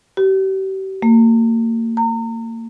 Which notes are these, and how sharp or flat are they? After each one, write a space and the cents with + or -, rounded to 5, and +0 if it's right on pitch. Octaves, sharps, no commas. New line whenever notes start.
G4 -40
A#3 -35
A#5 -35